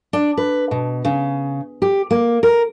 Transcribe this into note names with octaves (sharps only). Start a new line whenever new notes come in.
D4
B4
B2
C#3
G4
A#3
A#4